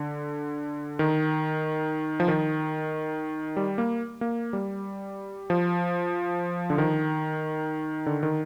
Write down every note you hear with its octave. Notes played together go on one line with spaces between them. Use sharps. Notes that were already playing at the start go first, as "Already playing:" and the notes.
Already playing: D3
D#3
F3
D#3
G3
A#3
A#3
G3
F3
D3
D#3
D3
D#3